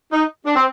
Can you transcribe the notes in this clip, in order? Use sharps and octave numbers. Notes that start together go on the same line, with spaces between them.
D#4
D4
C4